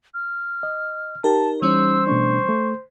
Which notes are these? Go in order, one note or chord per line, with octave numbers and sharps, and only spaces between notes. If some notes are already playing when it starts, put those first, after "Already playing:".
F6
D#5
D#4 G4 A#4 A5
E3 G3 C#4 C5 E6
B2 A3 D4 C#6
A3